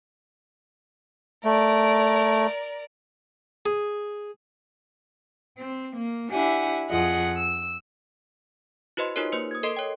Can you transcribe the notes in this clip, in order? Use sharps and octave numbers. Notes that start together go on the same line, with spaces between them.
A3 A#4 D5
G#4
C4
A#3
D4 E4 G4 F#5 G#5
F2 F4 G#4 D#5 F#5
E6
E4 F#4 B4 C5 D#5 C6
D#4 F4 G4 A#4 C#5
A#3 B4 C5 C#7
D#6 G#6
A4 A#4 D#5 C6 C7 D7
C#5 G5